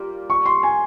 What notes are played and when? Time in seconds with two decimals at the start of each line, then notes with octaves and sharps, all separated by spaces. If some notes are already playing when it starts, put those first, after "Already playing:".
Already playing: G3 A#3 F4
0.30 C#6
0.46 C6
0.63 G#5